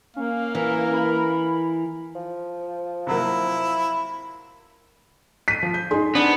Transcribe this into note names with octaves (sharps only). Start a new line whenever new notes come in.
A#3 C#4 F5
E3 A#4
B5
F3
C3 F#3 A#3 E4
B6 D#7
F3
G6
D#4 G#4 C6
B3 C4 D4